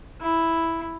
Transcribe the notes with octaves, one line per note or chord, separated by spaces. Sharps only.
E4